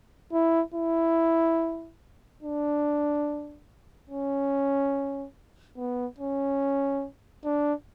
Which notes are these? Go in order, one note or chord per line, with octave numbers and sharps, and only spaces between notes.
E4
E4
D4
C#4
B3
C#4
D4